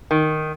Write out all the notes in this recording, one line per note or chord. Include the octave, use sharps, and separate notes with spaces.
D#3